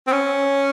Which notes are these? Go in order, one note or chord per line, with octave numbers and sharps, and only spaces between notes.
C4
C#4